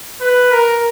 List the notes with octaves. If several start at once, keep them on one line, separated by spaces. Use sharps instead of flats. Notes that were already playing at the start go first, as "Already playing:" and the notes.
B4
A#4